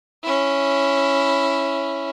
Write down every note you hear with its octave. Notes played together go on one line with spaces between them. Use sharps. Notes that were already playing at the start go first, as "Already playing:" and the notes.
C#4 E4